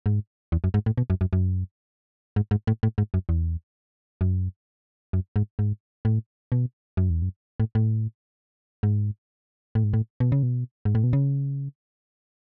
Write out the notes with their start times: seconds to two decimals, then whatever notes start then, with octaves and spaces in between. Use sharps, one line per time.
0.06 G#2
0.52 E2
0.64 F#2
0.74 G#2
0.86 A2
0.98 B2
1.10 F#2
1.21 F#2
1.33 F#2
2.36 G#2
2.51 G#2
2.67 A2
2.83 A2
2.98 G#2
3.14 F#2
3.29 E2
4.21 F#2
5.13 F#2
5.36 G#2
5.59 G#2
6.05 A2
6.52 B2
6.97 F#2
7.10 E2
7.22 F#2
7.60 A2
7.75 A2
8.83 G#2
9.75 A2
9.84 G#2
9.94 A2
10.20 B2
10.32 C#3
10.43 B2
10.85 G#2
10.95 A2
11.04 B2
11.13 C#3